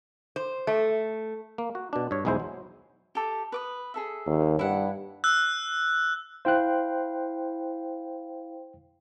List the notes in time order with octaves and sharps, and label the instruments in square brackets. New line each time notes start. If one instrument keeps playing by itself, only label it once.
[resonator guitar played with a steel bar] C5
A3
[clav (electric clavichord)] A#3
F#4
B2 D4
G2 C#5
B1 E2 G#3 E4 C5
F#3
[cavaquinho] G4 A4
B4 D6 D#6
G#4 A4 E5
[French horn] D#2
[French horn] G2 [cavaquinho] E4 F#5
[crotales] E6 F#6
[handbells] E4 F5 [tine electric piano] C5 G5 F#6